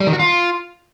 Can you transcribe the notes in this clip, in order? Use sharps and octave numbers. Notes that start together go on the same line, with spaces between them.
G3
D#3
F#4
F4